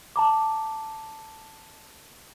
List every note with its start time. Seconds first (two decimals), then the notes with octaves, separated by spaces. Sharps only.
0.16 A5 A#5 D6